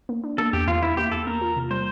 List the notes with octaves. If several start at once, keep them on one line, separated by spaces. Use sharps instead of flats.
A#3
D4
A#3 A4
E2 G4
E2 F4
E3 E4
A#3 G4
E2 A4
A#3 A#4
F4
C3
G3 C5